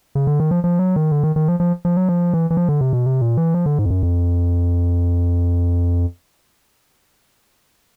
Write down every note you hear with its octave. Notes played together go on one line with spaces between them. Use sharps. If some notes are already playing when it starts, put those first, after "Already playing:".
C#3
D3
D#3
F3
F3
F#3
D#3
D3
D#3
D#3
F3
F3
F3
F#3
F3
E3
E3
F3
D3
C3
B2
C3
A#2
E3
F3
D3
G#2
F2
F#2
F2